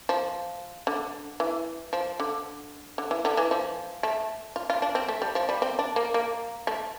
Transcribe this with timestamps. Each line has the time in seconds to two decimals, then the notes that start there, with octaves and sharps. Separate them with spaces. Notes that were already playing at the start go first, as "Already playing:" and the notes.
0.09 F3
0.87 D3
1.40 E3
1.93 F3
2.20 D3
2.98 D3
3.11 E3
3.25 D3
3.37 E3
3.51 F3
4.03 A3
4.56 F4
4.70 F4
4.82 D4
4.95 C4
5.08 A3
5.22 G3
5.35 F3
5.49 G3
5.62 C4
5.79 D4
5.96 A#3
6.14 A#3
6.67 A3